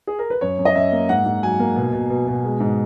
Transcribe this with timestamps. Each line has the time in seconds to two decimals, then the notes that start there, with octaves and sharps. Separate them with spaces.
0.07 G#4
0.19 A#4
0.30 B4
0.41 F#2 C#5
0.59 F#2
0.65 D#5
0.75 F#2 E5
0.92 A#3
1.09 G#2 F#5
1.25 G#2
1.43 F#3 G#5
1.60 A#3
1.76 B2
1.93 B2
2.10 B2
2.28 B2
2.44 G#3
2.60 G#2